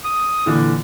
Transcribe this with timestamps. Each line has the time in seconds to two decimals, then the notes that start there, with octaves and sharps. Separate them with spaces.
0.04 D#6
0.46 A#2 D3 E3